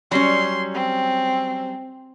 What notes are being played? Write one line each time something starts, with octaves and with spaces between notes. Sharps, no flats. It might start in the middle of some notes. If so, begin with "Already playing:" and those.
F#3 G3 C#4 C6
C4